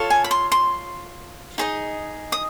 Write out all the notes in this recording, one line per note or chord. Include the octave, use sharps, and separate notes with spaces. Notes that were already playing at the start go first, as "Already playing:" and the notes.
Already playing: F4 A4 C#5
G#5
B5
C6
C6
D#4 G#4 C5 D#5
D#6